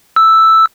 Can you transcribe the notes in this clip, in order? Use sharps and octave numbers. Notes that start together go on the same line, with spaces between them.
E6